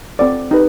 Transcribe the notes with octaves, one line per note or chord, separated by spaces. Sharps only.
C4 F4 A4 D5 F#5
D#4 G4 B4